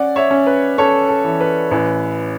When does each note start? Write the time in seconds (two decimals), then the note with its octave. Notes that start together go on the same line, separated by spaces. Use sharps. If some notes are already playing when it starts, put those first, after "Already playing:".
Already playing: C#4 D5 F#5
0.16 C#5 E5
0.31 C#4
0.47 B4
0.78 C#4 A4 C#5
1.09 A4
1.24 E3
1.41 B4
1.71 A1 B4